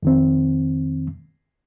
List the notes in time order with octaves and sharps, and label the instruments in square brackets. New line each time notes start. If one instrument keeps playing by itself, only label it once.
[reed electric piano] F2 D#3 C4